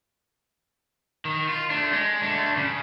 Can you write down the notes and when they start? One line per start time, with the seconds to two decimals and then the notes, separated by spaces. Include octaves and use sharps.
1.25 D#3
1.49 F4
1.70 A3 D4
1.93 G#3
2.21 A3 D4
2.57 C#3